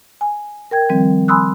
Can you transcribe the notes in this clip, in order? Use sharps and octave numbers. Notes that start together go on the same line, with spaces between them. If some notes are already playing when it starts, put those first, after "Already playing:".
G#5
A#4 G5 G#6
D#3 F3 G3 C4
G#5 B5 C6 D#6 E6 F#6